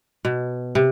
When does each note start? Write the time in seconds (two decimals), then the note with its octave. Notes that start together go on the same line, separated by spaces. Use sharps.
0.25 B2
0.75 C3